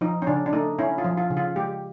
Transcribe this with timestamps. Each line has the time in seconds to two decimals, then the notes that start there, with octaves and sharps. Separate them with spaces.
0.01 F3 D#4
0.22 C#4
0.27 C#3 D4
0.46 D4
0.53 A3 D#4
0.79 C#4 E4
0.98 F4
1.05 F3
1.17 F4
1.30 C#3
1.37 F4
1.56 G#3 G4